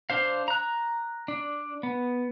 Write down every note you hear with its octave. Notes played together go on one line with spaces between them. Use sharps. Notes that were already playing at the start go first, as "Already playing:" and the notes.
D4 C5 F5
A#5 F#6
D4
B3